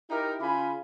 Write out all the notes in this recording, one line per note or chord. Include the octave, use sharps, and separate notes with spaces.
D#4 E4 G4 A#4
C#3 F4 G#5 B5